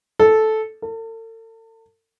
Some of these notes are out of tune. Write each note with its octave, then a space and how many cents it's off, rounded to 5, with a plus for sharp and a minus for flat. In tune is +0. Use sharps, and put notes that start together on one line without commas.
A4 -10
A4 +40